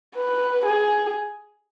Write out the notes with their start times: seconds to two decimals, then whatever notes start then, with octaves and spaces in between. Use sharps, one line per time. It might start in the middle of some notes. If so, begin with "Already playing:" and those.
0.16 B4
0.66 G#4